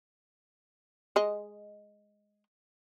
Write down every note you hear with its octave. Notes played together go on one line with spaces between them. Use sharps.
G#3 D#5